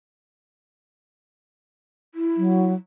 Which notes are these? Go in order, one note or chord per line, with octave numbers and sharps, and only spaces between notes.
E4
F#3